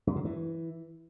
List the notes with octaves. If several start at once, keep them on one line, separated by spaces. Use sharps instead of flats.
F#2
C#3
E3